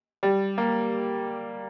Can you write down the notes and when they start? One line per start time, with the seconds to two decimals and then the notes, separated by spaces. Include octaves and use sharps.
0.23 G3
0.58 A#3